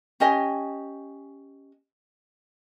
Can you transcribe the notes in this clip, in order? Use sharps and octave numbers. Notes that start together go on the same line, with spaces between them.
C#4 G4 D#5 G#5